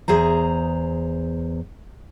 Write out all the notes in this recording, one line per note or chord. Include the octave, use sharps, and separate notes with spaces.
E2 G#4 C5 A#5